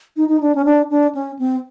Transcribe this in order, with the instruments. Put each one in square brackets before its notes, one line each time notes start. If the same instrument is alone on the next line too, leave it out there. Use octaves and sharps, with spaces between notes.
[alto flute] D#4
D#4
D4
C#4
D4
D4
C#4
C4